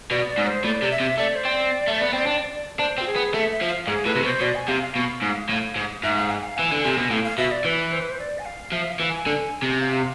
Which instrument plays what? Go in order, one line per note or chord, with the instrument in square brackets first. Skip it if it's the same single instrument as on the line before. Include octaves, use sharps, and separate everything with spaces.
[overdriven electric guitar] B2 [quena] D5
[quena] D5
[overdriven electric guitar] G#2
[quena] C5
[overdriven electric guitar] A2 [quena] D5
[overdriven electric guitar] C3
[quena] E5
[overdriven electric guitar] C3
[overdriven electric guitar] A3 [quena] D5
[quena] C5
[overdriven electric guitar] C4 [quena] D5
[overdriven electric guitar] A3
B3
C4
D4
[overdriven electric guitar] D4 [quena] C5
[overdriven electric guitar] C4
[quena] F4
G#4
[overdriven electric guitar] B3
[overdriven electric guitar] A3 [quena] E5
[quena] E5
[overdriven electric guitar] F3
[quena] F5
[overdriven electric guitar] G#2 [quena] G#4
[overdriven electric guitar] A2 [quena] B4
[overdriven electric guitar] C3
[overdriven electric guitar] B2 [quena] C5
[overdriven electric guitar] B2 [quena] D5
[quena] G#5
[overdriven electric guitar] C3 [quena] F5
[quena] F5
[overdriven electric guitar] B2
G#2
A2
G#2
[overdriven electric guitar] G#2 [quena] E5
[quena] F5
G#5
F5
[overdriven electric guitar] E3 [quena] G#5
[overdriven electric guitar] D3
[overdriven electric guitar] C3 [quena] G#5
[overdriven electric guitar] B2
[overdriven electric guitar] A2 [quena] F5
[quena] F5
[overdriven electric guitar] B2 [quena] E5
[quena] D5
[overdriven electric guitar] E3 [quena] B4
[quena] C5
B4
C5
D5
G#5
F5
[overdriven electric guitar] F3 [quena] E5
[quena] F5
[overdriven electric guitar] E3
[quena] G#5
[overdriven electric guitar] D3
C3
[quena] F5